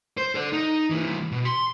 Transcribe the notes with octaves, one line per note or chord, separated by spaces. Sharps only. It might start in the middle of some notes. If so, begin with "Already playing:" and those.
C5
A4 D5
D#4
C2 E3
B2
C6